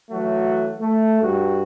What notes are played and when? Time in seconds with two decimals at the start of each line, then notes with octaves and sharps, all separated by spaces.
0.10 E3 F#3 A3 F#4
0.81 A3
1.21 G2 F#4